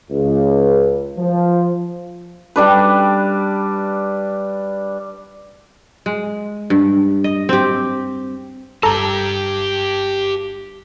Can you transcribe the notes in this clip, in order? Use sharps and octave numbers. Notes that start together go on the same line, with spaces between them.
C#2
F3
G3 D4 B4
G#3
G2
D#5
C4 G4
G1 G2 G4 A4 A5 A#5